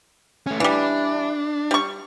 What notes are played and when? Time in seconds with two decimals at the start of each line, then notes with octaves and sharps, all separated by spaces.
0.47 A3 C#4
0.60 E3 G3 D4
1.71 G3 C#6